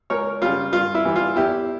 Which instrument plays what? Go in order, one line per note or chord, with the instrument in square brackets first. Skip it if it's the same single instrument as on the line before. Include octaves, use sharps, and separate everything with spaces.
[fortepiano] C#2 A#4 C#5
C#3 G3 F4
G2 F4
E4
E3 G3
F4
E2 E4 G4